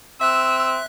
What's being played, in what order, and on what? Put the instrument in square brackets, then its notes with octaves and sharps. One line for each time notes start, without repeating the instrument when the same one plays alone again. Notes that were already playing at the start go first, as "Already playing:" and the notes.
[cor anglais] C4 [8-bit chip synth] E5 F#6 [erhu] E6